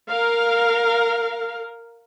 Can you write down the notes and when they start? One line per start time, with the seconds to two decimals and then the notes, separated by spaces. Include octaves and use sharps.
0.10 A#4 F5